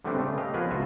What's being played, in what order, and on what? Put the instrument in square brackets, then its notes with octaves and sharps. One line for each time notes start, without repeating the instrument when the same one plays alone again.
[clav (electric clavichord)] D3 G3 A3 B3 C4 D4
C#3 A3
G4 D#5 F5
F3 B3 C#4 G#4 A#4 B4
C#2 F4 F#4 B4 E5